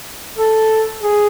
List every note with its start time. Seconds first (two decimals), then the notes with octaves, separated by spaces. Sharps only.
0.38 A4
1.02 G#4